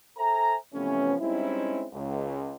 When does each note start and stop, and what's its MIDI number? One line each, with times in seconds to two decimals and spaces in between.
0.17 0.56 69
0.17 0.56 72
0.17 0.56 76
0.17 0.56 80
0.17 0.56 82
0.74 1.15 48
0.74 1.15 52
0.74 1.15 53
0.74 1.15 57
0.74 1.15 59
0.74 1.15 61
1.20 1.85 55
1.20 1.85 56
1.20 1.85 60
1.20 1.85 61
1.20 1.85 63
1.20 1.85 64
1.93 2.56 37